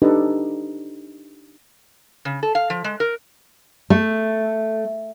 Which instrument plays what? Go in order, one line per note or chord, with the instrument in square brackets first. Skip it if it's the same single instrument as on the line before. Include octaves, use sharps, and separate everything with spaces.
[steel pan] D4 D#4 G4 A4 B4 D#5
[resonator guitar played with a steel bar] C#3
A4
F5
F3
G#3
A#4
[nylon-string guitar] A3